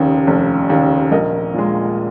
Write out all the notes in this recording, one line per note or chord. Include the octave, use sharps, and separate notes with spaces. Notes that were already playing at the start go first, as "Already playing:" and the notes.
Already playing: F1 D#2 C#3
F1
D#2 C#3
A#1 A#4 D#5
A#2 G#3